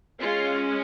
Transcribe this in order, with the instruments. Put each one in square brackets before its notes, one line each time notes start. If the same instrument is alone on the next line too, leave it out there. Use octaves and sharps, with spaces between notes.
[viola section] G#3 C#4 F4